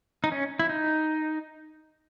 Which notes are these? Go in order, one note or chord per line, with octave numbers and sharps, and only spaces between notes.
D#4
C#4
E4
D#4